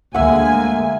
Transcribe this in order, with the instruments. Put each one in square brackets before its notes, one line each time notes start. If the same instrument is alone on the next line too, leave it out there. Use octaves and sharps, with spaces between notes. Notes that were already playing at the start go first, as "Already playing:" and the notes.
[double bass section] D2 D3 G#3 [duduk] A#3 [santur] E5 F#5 [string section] G#5